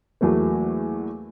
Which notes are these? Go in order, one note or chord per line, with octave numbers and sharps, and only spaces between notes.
E2 F#3 A3 A#3